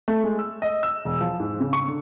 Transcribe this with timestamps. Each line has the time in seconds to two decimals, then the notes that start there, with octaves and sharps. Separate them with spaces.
0.08 A3
0.24 G#3
0.39 E6
0.62 D#5
0.83 E6
1.05 E1
1.21 F3
1.40 G#2
1.60 C#3
1.73 C#6
1.88 D3